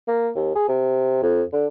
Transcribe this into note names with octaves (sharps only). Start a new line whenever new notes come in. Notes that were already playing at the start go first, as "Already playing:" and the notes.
A#3
D#2
G#4
C3
F2
D3